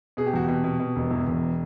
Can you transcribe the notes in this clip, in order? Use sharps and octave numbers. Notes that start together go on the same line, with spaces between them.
B2 G#4
G4
E2 F#4
B2 G4
B2
B2
E1
E2
E1